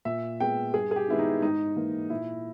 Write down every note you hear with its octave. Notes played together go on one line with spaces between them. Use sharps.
A#2 E5
G#3 B3 G5
G2 G#4
G#4
G4
D#3 G#3 B3 E4
D#4
G#2 D#4
E3 A#3
A#2 E4